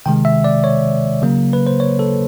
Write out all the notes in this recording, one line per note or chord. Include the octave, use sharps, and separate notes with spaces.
C3 D#3 G#3 G5
E5
D5
C#5
C#3 F#3 A#3
B4
C5
C#5
A4